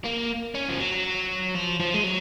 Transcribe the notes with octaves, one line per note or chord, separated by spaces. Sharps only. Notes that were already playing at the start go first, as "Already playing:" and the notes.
A#3
C#4
F3
F#3
F3
F3
G#3
F#3